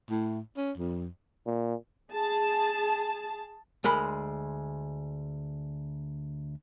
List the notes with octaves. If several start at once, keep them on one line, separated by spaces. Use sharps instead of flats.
A2
C#4
F2
A#2
G#4 A5
D2 G#3 A#4 B5